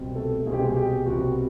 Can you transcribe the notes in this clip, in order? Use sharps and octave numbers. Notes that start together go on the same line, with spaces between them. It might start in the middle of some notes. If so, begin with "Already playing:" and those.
Already playing: C2 B2 G3 C4
A3 A4
C2 B2 G3 C4 G#4
G4
G#3 G#4
G4
C2 B2 G3 C4 F#4